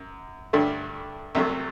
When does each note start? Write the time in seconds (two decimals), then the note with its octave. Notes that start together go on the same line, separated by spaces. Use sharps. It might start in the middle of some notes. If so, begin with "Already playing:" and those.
Already playing: F#2
0.53 G2 D3 A3
1.35 C2 C3 F#3 A3 E5